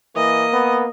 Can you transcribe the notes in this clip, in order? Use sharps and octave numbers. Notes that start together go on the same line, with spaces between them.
E3 A#3 D#5
B3